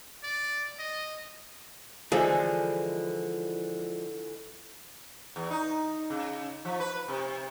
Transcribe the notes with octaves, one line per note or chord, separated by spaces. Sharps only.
D5
D#5
D3 E3 F3 G#3 A4
E2
D#4
C#3
F3
B4
C3